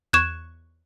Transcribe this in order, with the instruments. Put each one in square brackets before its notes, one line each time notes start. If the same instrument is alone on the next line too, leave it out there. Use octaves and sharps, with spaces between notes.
[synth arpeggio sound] E2 C#6 [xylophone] F#6 G#6 E7